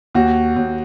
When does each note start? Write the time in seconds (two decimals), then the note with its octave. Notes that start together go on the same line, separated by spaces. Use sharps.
0.15 D#2 F#4
0.56 D#2